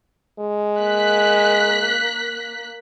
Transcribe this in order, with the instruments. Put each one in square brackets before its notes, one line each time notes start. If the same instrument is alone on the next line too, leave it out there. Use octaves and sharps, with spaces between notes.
[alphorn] G#3
[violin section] A#3 F#6 B6